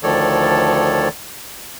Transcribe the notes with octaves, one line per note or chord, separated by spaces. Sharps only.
D2 D#3 F3 A4 C#5 D5